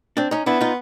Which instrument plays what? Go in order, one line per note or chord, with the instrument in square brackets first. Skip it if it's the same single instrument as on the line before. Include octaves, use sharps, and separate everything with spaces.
[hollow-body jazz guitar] C4 D4
C#4 D#4
[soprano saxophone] B3 [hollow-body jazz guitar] D4 E4
[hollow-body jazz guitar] D#4 F4